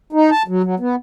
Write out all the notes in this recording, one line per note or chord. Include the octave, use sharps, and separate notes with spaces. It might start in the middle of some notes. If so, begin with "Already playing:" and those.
D#4
A5
F#3
F#3
B3